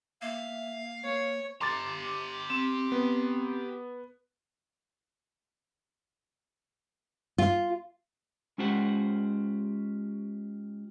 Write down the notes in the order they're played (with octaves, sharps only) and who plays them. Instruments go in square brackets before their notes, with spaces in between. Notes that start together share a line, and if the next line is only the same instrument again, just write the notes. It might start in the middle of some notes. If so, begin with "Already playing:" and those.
[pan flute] A#3 [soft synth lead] E5 [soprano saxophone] F5
[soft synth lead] A#3 [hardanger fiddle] C#5
[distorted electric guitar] G4 A#5 [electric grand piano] C6 D6 A6
[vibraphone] C4
[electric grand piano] B3
[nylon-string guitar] F4
[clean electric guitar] G#3 C#4 F4 G4 C5 F#5